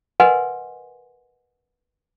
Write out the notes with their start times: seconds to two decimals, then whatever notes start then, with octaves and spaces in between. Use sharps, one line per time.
0.20 A#4 B4 D#5 F#5 G#5 C6